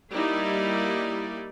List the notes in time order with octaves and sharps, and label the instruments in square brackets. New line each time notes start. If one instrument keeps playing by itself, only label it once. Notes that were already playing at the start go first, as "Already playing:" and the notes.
[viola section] G3 A#3 D#4 E4 D5